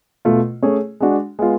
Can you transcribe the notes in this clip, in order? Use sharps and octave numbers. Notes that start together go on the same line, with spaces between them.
B2 A3 F4
A3 C#4 G#4 C#5
G#3 D4 F#4
G#3 B3 F4